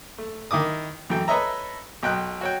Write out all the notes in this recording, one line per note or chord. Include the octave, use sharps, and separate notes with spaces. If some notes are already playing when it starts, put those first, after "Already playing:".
A3
D#3 E4 D6 D#6
F#2 E3 A3 G5
A4 B4 C#5 D#5 E5 A#5
B1 G5 F#6
F#4 C#5 G5